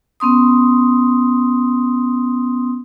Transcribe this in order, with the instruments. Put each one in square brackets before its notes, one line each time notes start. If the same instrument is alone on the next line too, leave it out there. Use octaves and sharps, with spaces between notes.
[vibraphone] B3 C#4 C6 D#6